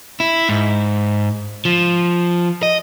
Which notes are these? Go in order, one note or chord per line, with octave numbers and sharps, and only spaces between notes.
E4
G#2
F3
D#5